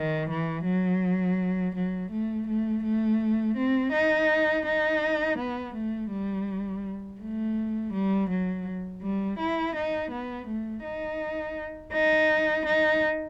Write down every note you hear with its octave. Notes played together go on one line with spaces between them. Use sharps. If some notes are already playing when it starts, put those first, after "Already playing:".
Already playing: D#3
E3
F#3
F#3
A3
A3
A3
C4
D#4
D#4
B3
A3
G3
A3
G3
F#3
G3
E4
D#4
B3
A3
D#4
D#4
D#4